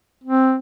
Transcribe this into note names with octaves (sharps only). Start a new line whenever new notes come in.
C4